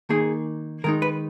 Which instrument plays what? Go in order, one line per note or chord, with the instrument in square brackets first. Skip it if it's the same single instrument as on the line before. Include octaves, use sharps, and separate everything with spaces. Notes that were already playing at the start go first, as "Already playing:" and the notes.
[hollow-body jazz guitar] D#3 A#3 D#4 G#4
D#3 G#3 D#4 A#4
B4